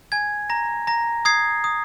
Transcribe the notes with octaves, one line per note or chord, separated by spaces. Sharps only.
G#5 G#6
A#5 A#6
A#5 A#6
D#6 G#6 C7
D#6